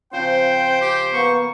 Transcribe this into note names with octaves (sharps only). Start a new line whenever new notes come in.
C#3 F3 C4 C5 G5
G4
A#3 B3 C#6